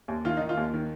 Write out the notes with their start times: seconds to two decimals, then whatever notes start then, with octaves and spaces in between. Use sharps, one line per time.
0.08 D#2
0.25 D#3 F4
0.37 D#3 D#4
0.49 F4
0.57 D#2
0.74 D#3